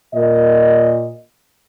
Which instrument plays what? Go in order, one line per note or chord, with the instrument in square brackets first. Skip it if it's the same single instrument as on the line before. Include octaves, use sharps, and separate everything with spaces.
[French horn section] A#2 D#5